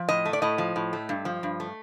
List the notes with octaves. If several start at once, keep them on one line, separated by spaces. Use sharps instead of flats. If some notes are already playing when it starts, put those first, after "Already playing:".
Already playing: F3
A2 D#5
A3
D5
A2 D#5
F3
A2
A3
G2
F3
G2
A3